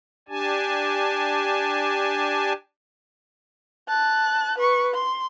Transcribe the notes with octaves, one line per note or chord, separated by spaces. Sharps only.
D4 G4 G#5 A5
A5 F#6
B4 C#6
C6